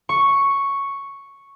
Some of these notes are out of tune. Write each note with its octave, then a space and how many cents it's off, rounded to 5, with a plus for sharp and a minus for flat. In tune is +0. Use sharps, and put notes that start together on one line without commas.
C#6 +0